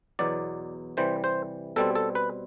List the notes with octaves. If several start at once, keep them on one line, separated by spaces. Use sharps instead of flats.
E2 B2 F#3 D5
C3 E3 G3 C5
C5
B2 G3 C4 A4
A4
B4